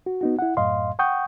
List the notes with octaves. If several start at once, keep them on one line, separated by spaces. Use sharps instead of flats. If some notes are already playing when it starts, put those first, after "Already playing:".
F#4
B3 D#4 F#4
E4 F#5
F#2 A2 D#5 F5 C6
F#5 G5 C#6 D#6 G6